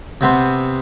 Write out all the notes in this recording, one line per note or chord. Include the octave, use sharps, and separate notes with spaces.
C3 B3 C4